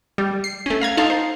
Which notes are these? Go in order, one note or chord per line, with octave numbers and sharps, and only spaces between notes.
G3
C7
A3 C#4
F5 A#5 G#6
D#4 A4 F5 C6
C5